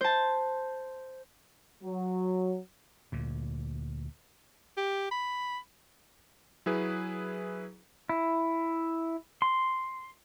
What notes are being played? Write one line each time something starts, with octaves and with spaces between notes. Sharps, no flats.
C5 A5
F#3
D2 A#2
G4
B5
F#3 E4 G#4 B4
E4
C6